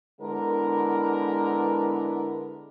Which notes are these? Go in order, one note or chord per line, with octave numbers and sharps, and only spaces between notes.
D3 G#3 B3 E4 A#4 B4